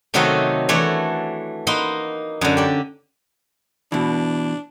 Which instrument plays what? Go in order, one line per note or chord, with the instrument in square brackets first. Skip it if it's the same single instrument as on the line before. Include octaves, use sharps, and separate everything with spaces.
[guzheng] C3 D#3 F#3 A3 D#4 F#4
E3 A3 D4 F#4 C#5 D5
A#3 D#4 F#5 B5 C6
F#2 D3
G4 D5
[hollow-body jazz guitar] B2 E3 [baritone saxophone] D4